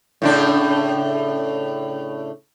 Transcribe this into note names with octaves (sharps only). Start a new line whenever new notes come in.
A2 C#3 D4